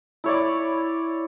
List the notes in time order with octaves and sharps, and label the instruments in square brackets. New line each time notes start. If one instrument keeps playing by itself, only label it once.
[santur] E4 C#5 D5